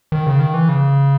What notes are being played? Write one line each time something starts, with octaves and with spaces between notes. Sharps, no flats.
D#3
C#3
D#3
E3
C#3